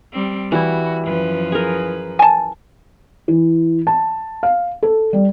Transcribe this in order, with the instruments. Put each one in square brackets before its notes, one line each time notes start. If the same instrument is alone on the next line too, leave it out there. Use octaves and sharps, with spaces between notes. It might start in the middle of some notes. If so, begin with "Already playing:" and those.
[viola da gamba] G3 C4
[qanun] E3 G3 E4 [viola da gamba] F#4
[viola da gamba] F#2 F3 B4
[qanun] G#4 A#4
[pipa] G#5 A5
[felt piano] E3
A5
F5
A4
G3